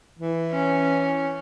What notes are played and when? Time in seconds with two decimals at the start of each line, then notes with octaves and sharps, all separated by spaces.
0.18 E3
0.51 C#4